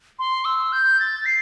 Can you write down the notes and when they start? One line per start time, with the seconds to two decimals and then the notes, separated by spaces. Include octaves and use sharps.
0.19 C6
0.45 E6
0.72 G6
1.00 A6
1.26 C7